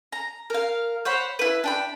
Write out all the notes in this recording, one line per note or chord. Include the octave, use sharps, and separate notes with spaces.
A#5
A#4 F5
C5 C#5 F#5 B5
E4 B4
D4 G5 B5